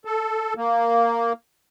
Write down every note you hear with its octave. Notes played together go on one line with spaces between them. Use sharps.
A4
A#3